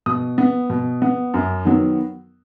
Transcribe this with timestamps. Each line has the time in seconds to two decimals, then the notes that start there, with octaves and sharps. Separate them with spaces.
0.06 B2 D#6
0.38 B3
0.70 B2
1.02 B3
1.34 F#2
1.65 D#3 F#3 B3